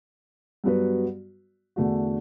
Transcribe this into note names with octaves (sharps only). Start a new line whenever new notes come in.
G2 F#3 B3 F#4 B4
E2 D3 A3 D4 F#4